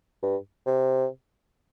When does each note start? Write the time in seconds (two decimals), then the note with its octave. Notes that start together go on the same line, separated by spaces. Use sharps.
0.23 G2
0.66 C3